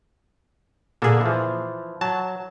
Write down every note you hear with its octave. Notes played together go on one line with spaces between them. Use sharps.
A#2 D3 A#3 G#4 A4
E3 F3
F#3 A5